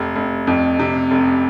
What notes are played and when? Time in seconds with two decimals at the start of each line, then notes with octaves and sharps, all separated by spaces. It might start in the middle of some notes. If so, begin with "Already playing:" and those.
Already playing: F1
0.16 F1
0.47 F2
0.79 C3
1.11 F1